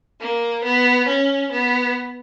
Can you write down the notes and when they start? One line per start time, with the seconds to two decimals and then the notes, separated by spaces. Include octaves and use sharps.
0.21 A#3
0.64 B3
1.08 C#4
1.52 B3